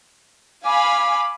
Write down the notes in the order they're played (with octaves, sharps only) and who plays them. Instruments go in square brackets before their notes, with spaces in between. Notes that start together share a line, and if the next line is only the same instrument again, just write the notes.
[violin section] F5 G#5 B5 [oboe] D6